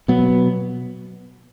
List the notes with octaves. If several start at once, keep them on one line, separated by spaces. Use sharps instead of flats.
B2 F#3 B3